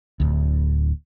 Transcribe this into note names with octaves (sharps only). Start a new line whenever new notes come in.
D1 D2